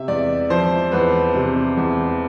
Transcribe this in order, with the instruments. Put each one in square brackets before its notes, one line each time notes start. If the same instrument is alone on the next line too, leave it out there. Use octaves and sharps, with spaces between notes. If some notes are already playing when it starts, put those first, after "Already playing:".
Already playing: [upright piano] C3 E5
E2 D5
F3 C5
E2 B4
C3
E2